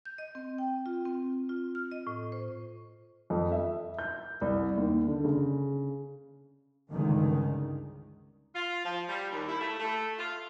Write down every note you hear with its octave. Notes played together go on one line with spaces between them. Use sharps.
G6
D#5
C4
G5
F4
C4
F4
F6
D#5
A2
C5
F2
E5
G6
C2
D#2
D3
C#3
C#2 G2 D3 D#3
F4
F3
G3
D#2
E4
A3
A3
F4